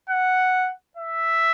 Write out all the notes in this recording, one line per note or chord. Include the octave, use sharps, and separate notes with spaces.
F#5
E5